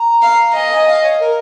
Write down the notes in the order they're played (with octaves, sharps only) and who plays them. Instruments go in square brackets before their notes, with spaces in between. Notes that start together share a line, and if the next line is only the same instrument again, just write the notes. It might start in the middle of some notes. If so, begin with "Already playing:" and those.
Already playing: [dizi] A#5
[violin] F5
[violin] D#5 [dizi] G#5
[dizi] F5
G#5
F5
C#5
A#4